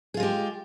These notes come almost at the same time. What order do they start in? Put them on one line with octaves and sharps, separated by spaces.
G#4 F4 G#3 G4